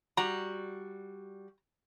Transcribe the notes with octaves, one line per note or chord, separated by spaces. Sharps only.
G3 F#4 A#5